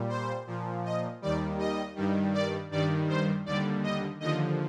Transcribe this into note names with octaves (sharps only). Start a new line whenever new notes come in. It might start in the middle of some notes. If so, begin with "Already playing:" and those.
Already playing: A#2 G3
C5
A#2 F3
D#5
D#2 D#3 G3 D5
D#5
G2 D#3 G3
D5
G2 D#3 G3 D5
C5
D#2 D3 G3 D5
D#5
D#2 D3 F3 D#5